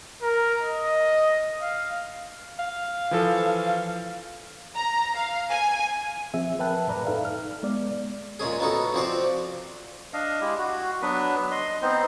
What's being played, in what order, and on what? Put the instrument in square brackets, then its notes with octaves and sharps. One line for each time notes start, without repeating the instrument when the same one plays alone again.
[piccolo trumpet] A#4
D#5
F5
[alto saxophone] F5
[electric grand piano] E3 F3 A4
[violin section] A#5
F5
G#5
[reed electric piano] F3 C4 G#4 E5
A#4 B4 E5 G5 A5 F#6
F#2 A2 B4 D5 A#5
D#4 A4 D5 E5 F5
F6
G#3 B3 D5
[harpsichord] A#2 G#3 C#4 G#4
B3 C#4 D#4 F#4 A4
F3 C4 F#4 C5 D5
[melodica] D4 D#5 F5
G#3 E4 G4
F#4
F#3 B3 D4 B4
D#5 C6
B3 C4 D#4 C5